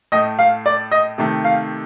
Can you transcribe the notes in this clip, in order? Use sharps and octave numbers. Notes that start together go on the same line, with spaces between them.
A2 A3 D#5
F5
D5
D#5
C3 D#3 A3
F5